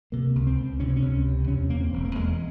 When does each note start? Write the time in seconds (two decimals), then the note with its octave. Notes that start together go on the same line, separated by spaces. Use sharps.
0.12 C3 A#3
0.35 C#2
0.47 C4
0.58 C#2
0.80 C3 C#4
0.88 C4
0.96 C#4
1.02 C#2
1.25 C3
1.48 E2 C#4
1.70 E2 A#3
1.81 C4
1.93 E1
2.05 A#3
2.15 E2 G#3